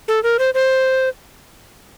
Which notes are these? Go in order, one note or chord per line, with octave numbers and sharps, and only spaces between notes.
A4
A#4
C5
C5